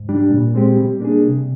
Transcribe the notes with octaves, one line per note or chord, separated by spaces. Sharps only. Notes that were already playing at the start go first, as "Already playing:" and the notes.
Already playing: G#2
G3 D4
A#2
G#3 C4 G4
G3
A#3 D4 G#4
C3